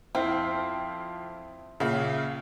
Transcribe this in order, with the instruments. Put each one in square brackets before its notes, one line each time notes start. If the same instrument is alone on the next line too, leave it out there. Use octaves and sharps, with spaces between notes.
[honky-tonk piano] F2 F5 G5 [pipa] C4 [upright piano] E4
[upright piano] A#2 [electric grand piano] C#3 [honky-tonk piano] E5 F5